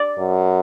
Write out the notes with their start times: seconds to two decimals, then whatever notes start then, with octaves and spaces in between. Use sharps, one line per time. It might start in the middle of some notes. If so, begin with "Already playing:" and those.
Already playing: D5
0.19 F#2